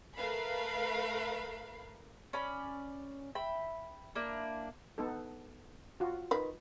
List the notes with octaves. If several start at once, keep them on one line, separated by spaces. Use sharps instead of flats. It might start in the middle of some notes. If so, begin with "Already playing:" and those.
A3 A#4 B4 F5 B5 C7
C#4 D5 B5
E5 G5 B5
A#3 D4 E4
B3 D#4 A4
F4 F#4
D#3 B4